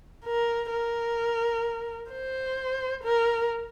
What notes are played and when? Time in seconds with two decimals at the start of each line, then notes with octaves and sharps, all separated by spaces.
0.25 A#4
0.71 A#4
2.11 C5
3.04 A#4